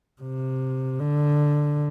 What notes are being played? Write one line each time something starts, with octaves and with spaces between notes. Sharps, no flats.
C3
D3